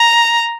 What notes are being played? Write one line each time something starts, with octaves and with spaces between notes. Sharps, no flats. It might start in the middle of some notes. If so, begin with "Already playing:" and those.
Already playing: A#5